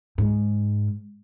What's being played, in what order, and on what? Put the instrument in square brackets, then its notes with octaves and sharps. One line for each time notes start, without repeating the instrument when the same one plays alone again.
[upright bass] G#2